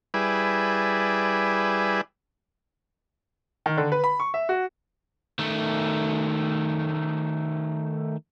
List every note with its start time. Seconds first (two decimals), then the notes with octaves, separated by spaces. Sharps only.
0.14 G3 E4 G#4 B4 D5
3.66 D#3
3.77 D3
3.92 B4
4.04 B5
4.20 C#6
4.34 E5
4.49 F#4
5.39 D#3 A3